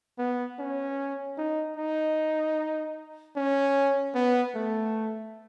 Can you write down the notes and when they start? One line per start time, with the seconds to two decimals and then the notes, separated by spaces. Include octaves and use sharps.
0.19 B3
0.59 C#4
1.38 D#4
1.77 D#4
3.36 C#4
4.15 B3
4.55 A3